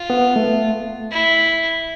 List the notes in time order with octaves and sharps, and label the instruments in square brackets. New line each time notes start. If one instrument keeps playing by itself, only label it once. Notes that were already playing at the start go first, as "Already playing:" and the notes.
Already playing: [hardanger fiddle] F4
[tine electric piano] B3
A3
[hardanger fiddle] E4